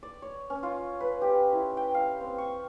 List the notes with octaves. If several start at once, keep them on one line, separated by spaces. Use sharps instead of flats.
D5
C#5
C#4
F4
B4
G4
E4
G5
F5
C4
C#6